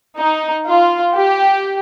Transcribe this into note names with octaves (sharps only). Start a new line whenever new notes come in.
D#4
F4
G4